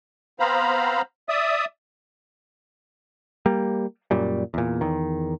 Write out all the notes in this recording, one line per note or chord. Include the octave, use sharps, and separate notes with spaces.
B3 C4 C5 F5 A#5 B5
D5 E5 D#6
G3 A#3
F#2 A#2 G3
E2 A#2
E2 D#3